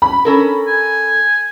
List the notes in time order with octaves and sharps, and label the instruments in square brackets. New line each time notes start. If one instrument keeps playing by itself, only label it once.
[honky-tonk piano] B5
[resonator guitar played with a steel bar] C#4 A4 A#4
[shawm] G#5